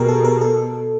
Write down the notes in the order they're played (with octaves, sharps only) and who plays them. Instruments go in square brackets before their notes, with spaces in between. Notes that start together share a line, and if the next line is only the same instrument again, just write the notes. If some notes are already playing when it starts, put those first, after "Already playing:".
Already playing: [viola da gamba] B2 [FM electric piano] G4 G#4 A#4
[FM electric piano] A4
A#4
A4